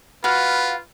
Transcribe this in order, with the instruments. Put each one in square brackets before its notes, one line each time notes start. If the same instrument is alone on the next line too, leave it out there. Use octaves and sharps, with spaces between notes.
[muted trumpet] F4 [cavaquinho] F#4 F5 [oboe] B4